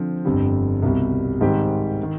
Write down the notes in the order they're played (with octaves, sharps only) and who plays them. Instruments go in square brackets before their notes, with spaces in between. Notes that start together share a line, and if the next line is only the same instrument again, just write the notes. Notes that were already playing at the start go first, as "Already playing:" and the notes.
Already playing: [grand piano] D3 F3 C4
G1 F2 D3 G3
C2 B2 G3
G#2 D#3 G3 C4 G4
D#3